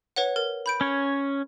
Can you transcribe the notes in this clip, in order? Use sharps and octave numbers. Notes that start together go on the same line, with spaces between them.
B4 C#5 F#5
A#4
B5 G6 D7
C#4 C#5